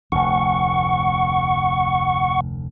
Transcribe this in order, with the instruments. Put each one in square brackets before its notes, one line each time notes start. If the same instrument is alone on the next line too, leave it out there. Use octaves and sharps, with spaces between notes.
[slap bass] F1 D2 [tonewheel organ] F#5 C#6